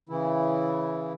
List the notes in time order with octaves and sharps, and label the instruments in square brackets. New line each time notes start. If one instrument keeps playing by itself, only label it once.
[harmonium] C#3 E3 E4